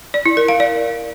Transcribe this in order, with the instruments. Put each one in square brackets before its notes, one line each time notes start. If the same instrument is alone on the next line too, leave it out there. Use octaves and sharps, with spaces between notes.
[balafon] D5
E4
A#4
F5
D5